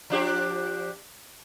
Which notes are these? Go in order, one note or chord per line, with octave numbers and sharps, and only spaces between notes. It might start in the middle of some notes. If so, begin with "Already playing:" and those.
F3 D4 G4